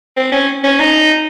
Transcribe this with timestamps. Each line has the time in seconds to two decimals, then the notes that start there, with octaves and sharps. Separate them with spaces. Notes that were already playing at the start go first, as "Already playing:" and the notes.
0.17 C4
0.32 C#4
0.64 C#4
0.80 D#4